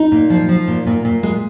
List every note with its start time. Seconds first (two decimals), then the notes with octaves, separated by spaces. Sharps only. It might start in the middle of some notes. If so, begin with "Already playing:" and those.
Already playing: D#4
0.12 A#2
0.30 F3
0.49 F3
0.68 A#2
0.87 A#2
1.05 A#2
1.23 G#3